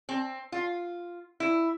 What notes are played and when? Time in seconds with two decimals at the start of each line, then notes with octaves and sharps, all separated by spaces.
0.09 C4
0.52 F4
1.40 E4